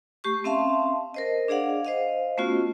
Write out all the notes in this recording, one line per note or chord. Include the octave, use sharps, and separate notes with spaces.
A3 G4 C#6
C4 C#4 E5 F5 A5 C6
A#4 C5 D#5
D4 G#4 D5 F5 F#5
C5 D#5 F5
A3 B3 C#4 F4 F#4